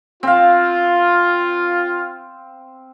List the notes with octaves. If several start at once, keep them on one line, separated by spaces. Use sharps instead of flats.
C4 F4 F5